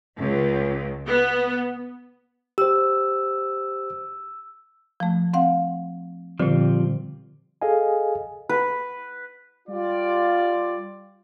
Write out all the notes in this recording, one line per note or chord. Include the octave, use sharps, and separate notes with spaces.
C#2
B3
G4 C5 E6
F3 A3
C4 F5 F#5
A#2 D3 F3 G3 C4
G#4 A4 D#5 F5 G#5
B4
G3 F4 D5